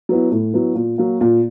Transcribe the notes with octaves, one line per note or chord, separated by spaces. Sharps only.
F#3 B3 E4
A2
F#3 B3 E4
A#2
F#3 A#3
A#2